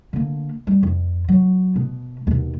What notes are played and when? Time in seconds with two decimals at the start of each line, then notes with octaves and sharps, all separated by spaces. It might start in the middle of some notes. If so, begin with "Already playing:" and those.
0.13 D3 A#3
0.67 G3
0.83 F2
1.28 F#3
1.76 B2
2.27 D#2 B2